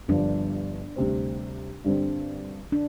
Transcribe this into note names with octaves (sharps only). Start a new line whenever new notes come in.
G1 G2 F3 D4
D2 C3 G3 C4
G2 D3 G3 C4
D4